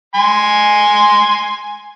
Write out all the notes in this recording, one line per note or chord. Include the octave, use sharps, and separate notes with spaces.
G#5 C6